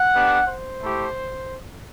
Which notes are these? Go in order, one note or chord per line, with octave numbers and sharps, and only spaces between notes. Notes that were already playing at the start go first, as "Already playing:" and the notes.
Already playing: F#5
B3 D4 G4
C5
A3 E4 G4